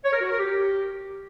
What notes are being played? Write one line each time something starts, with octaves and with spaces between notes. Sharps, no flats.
C#5
A#4
F#4
A#4
G4